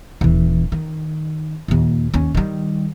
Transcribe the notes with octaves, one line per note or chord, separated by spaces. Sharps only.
D#1 E3
D#3
D#2 A#2
D#2 C#4
D#3 G3